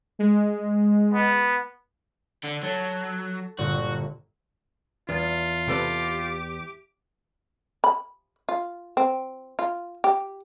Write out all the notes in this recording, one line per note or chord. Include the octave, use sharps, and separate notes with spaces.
G#3
B3
D3
F#3 A4
G1 G2 A#2 F#4
E2 F4
C3 G4 A4 B4 D6
B5
F4
C4
F4
G4